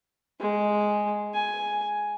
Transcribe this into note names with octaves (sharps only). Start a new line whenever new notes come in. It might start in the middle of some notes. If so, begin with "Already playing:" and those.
G#3
G#5